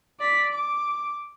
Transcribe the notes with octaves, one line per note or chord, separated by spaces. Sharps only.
D5 B6
D6